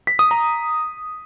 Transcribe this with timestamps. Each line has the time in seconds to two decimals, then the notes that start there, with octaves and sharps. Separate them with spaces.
0.07 B6
0.19 D#6
0.31 A#5